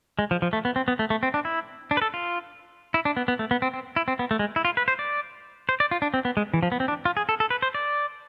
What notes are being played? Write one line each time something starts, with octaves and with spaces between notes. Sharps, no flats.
G#3
F3
F3
A3
B3
C4
B3
A3
A3
C4
D4
E4
D4
B4
A4
F4
E4
D4
B3
B3
A3
B3
C4
C4
E4
C4
B3
A3
G#3
E4
F4
B4
C5
D5
C5
D5
F4
D4
C4
B3
G#3
E3
F3
B3
C4
D4
F4
G#4
A4
A4
B4
C5
D5